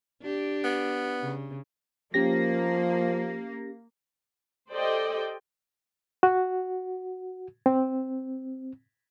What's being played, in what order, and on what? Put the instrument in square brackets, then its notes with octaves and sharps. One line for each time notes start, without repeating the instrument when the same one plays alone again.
[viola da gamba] D4 G4
[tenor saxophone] B3
[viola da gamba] C#3
[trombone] F3 [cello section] A#3 [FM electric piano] C#4 G4 A#6
[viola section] G4 A4 C5 D5 D#5 G5
[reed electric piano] F#4
C4